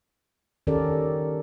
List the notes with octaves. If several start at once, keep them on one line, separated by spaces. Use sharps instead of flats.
D#3 C#4 G4 A4 A#4 D5